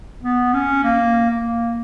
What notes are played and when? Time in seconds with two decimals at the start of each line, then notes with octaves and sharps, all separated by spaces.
0.22 B3
0.53 C#4
0.84 A#3
1.30 A#3